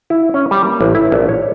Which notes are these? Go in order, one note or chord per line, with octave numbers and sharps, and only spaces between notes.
E4
C#4
G3
A#3
A1
E4
A#1
C#5